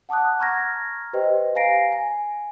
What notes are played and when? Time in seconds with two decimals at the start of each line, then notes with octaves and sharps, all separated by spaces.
0.09 F#5 A5 D6 D#6 F#6
0.39 A#5 C#6 F6 G#6 A#6
1.13 G4 B4 C5 D#5 G5
1.55 F5 G#5 A#5 A#6 C7 D7
1.92 G#5